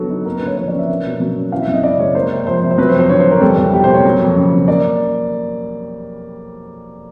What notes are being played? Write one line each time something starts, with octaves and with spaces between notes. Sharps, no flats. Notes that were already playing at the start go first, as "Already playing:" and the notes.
Already playing: D3 F#3 B3 A4
D#4
A#3 A#4
B4
D3
C#5
F3 C#5
D5
C#4
E5
A#3
B2
F#3
C#4
E3 F5
E5
F#2
D#5
C#3 D5
G#3 C#5
A#3 C5
C3
F3 C5
C3
C5
F#3 B4
C5
F2
C5
D3 C#5
C5
F2
A#4
G3 A4
E2
B2 G4
A#3 C5
C#5
F#3
F2
C#3
F2
A#3 D5